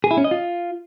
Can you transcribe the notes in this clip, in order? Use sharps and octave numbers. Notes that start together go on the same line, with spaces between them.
G#4
E4
C#4
D#5
F4